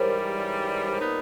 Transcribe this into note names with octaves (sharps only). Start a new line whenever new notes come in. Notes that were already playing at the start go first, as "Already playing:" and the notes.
Already playing: G#2 E3 G3 A#4 C5 C#5
A#2 G3 B3 D#4